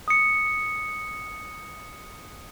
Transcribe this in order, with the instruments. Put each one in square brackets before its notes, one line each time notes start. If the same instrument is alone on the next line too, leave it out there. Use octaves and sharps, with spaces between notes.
[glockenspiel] D#6 C#7